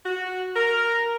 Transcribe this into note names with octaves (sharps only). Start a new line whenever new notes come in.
F#4
A#4